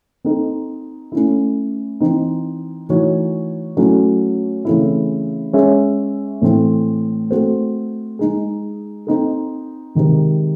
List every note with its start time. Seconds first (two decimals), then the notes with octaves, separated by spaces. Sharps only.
0.24 C4 D#4 A4
1.12 A3 C#4 E4
2.00 E3 C4 D#4
2.89 E3 A3 D#4 F#4 C#5
3.77 F#3 A3 C#4 E4
4.65 C#3 E3 A3 C4 E4
5.53 G#3 C#4 G#4 C#5 E5
6.42 A2 E3 A3 C4
7.31 A3 C4 F#4 A4 C5
8.19 G#3 D#4 G#4
9.07 C4 D#4 A4
9.95 C3 D#3 G#3